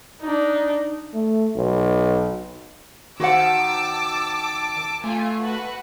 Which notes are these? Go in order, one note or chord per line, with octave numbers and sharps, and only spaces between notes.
D4 D#4
A3
B1
D#3 F#4 C5 F#5 A5 D6 E6
A3 F4 G#5
F#4 B4